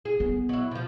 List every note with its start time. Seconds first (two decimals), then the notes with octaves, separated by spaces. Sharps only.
0.05 G#4
0.20 B3
0.49 F#3 E4
0.71 C3 F3